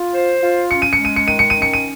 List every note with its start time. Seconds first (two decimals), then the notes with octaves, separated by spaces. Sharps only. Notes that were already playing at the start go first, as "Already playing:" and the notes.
Already playing: F4
0.14 C5
0.42 F4
0.70 C#4 C#7
0.82 D#7
0.93 G#3 C#7
1.05 D#7
1.16 C#7
1.27 D#3 D#7
1.39 C#7
1.50 C#4 D#7
1.62 C#7
1.74 D#7